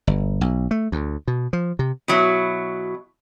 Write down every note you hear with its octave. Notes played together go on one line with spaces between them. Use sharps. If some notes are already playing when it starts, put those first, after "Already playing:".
G1
B1
A3
D2
B2
F3
C3
B2 F#3 E4